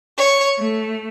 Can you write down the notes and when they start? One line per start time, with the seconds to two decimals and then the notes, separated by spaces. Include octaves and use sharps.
0.18 C#5
0.60 A3